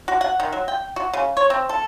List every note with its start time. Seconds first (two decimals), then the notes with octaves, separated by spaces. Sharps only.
0.08 F#4
0.21 F#5
0.40 D#3
0.53 F#3
0.68 G5
0.96 F#4
1.13 C#3
1.37 C#5
1.50 C4
1.69 A4